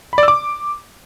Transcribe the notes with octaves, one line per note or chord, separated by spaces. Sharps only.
B5
D5
E6
D6